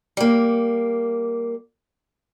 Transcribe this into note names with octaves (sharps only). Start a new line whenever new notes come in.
G3 A#3